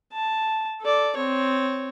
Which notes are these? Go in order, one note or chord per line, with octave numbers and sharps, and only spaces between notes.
A5
A4 D5
C4 C#5